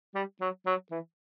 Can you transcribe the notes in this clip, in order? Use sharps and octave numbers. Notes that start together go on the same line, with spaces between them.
G3
F#3
F#3
E3